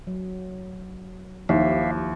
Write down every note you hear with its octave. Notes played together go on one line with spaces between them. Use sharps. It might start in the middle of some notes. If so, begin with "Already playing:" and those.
F#3
D#2 F3 E4 G4 E5 F5